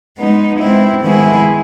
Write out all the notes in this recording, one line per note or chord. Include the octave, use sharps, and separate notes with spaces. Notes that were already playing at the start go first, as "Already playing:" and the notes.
G#3 B3 D#4
G#3 C4 E4
D#3 G#3 B3 E4 G#4